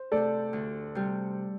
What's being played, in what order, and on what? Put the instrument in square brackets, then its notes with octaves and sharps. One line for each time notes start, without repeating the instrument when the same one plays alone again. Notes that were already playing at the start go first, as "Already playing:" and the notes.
Already playing: [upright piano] C5
[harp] C3 A3 [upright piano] A4 D5
[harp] D2
C3 G3